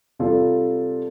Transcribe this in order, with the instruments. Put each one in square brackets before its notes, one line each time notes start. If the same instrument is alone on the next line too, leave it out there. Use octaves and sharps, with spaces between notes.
[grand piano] C3 G3 F4 A4